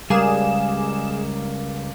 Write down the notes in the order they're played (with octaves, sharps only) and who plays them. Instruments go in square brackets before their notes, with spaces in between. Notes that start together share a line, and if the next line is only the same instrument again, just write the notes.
[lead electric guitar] C#2 [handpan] G3 [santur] A#3 D5 F5 [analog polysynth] G#4 E7